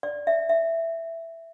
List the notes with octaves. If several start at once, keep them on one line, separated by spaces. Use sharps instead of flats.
D5
E5
E5